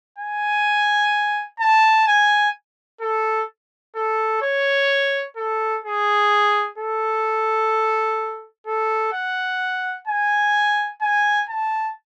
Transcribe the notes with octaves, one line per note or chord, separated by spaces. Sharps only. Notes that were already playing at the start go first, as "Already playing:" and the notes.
G#5
A5
G#5
A4
A4
C#5
A4
G#4
A4
A4
F#5
G#5
G#5
A5